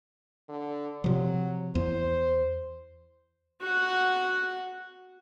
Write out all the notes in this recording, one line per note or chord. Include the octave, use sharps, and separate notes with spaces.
D3
C3 F3 F#3
E2 C5
F#4 F#5